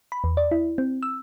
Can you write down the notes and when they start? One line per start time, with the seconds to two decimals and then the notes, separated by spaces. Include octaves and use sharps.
0.12 B5
0.24 E2
0.37 D5
0.51 E4
0.78 C4
1.03 E6